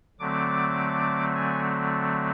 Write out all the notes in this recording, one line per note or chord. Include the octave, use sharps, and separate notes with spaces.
D3 F#3 A3 C4 D6
G#5